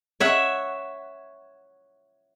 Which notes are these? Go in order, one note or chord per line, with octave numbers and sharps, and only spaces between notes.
C#5 E5 F#5